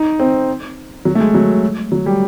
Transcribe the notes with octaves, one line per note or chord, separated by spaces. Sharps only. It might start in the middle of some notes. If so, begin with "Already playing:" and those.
Already playing: D#4
C4
F#3
A3
G#3
F#3
F#3
G3